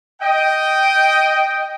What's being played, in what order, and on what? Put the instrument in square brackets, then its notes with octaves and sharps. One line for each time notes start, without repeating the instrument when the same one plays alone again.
[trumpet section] D#5 G5